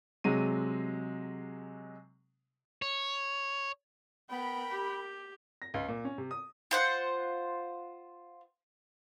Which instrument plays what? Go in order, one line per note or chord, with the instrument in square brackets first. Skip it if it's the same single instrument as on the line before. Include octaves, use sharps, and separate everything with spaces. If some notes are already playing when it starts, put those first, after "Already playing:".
[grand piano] C3 F#3 G#3 D#7
[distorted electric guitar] C#5
[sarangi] B3 [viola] A#4 G5 [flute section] B5
[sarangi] G4
[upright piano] A#6
C#2
A#2
C#4
C3
D#6
[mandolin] F4 C5 F#5